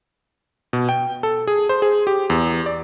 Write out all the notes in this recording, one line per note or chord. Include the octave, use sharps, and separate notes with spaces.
B2
G5
A4
G#4
C5
G#4
G4
E2
D5